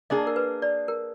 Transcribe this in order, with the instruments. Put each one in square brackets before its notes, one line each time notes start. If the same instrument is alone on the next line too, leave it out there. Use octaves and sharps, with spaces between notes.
[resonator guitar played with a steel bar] A#3 D4 G#4 [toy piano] D#5
[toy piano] A#4
B4
D5
A#4